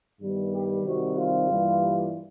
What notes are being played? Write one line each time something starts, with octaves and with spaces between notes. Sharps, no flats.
G2 D#3 G3 B3
G4
C3 D#3 G3 C4 F#4
F4
G2 E3 G3 A#3